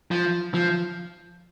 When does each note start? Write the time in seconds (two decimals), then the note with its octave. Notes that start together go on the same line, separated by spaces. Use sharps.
0.11 F3
0.54 F3